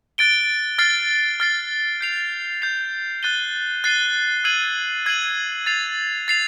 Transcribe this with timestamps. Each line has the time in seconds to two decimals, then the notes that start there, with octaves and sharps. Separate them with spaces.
0.18 F#6 A6 D7 G7
0.78 F6 A6 C7
1.40 F6 A6 C7
2.01 G6 C7 F7
2.62 G6 C7 F7
3.23 F#6 A6 C7 D#7 G7
3.84 F#6 A6 C7 D#7 G7
4.44 E6 G#6 C7 D#7 F#7
5.06 E6 G#6 C7 D#7 F#7
5.66 A6 C7 F7
6.28 A6 C7 F7